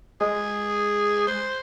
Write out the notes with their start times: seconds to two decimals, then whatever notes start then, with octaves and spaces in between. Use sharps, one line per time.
0.21 G#3 G#4
1.27 C5